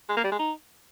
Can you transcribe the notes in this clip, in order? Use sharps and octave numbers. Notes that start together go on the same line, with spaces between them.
G#3
A#3
G3
G#3
D#4